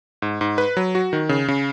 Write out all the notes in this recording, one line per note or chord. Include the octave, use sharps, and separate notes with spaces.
G#2
G#2
B4
F#3
F#4
D#3
C#3
C#3